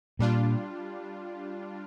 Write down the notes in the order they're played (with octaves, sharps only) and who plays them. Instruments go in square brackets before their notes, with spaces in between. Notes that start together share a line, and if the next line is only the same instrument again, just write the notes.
[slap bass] A#2 [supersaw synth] G3 D4 F4